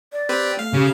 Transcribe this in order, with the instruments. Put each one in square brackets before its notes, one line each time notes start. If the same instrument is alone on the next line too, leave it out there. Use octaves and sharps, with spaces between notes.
[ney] D5
[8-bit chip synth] C4 G4 B4
[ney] A3 [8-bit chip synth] F5
[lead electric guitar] C#3 [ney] G4